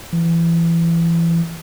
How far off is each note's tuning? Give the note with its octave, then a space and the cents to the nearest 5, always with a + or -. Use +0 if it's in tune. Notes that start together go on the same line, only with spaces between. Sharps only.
E3 +25